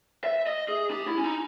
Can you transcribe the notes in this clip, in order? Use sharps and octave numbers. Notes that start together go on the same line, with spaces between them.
E5
D#5
G#4
G4
E4
C#4
D#4